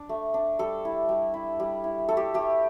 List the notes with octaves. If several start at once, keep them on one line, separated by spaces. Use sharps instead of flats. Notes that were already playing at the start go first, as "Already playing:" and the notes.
Already playing: D4
A3
D4
G3 A4
E4
G3
E4
G3
E4
A3 A4
G4
A3 G4